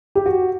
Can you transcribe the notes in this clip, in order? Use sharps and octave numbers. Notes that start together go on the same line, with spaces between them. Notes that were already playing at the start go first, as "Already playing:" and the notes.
G4
F#4